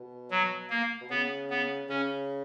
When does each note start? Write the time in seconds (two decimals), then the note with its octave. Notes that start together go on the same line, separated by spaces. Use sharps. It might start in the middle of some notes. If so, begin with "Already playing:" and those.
Already playing: B2
0.31 F#3
0.70 A#3
1.01 B2
1.10 C#3 B3
1.50 B3
1.89 C#3 C#4